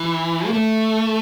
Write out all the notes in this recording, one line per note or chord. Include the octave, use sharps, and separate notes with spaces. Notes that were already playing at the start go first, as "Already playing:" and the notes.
Already playing: E3
A#3
A3